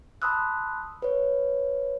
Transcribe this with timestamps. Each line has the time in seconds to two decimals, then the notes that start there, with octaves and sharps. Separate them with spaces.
0.22 A5 B5 C6 D#6 E6 F#6
1.02 B4 C#5